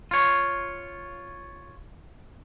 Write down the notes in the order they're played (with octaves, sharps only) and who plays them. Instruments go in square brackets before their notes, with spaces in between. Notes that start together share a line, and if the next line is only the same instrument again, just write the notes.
[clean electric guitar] F4 C#5